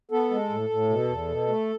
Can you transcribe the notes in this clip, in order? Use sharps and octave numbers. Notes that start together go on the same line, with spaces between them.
B3 A4
G#3
A2
A2
B2
E2
B2
A3